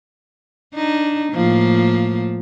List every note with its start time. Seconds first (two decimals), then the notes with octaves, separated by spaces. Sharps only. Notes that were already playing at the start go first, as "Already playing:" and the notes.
0.75 D4 D#4
1.33 A2 F3 A#3